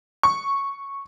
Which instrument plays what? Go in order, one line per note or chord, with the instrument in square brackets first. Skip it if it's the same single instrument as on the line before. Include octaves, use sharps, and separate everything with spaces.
[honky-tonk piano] C#6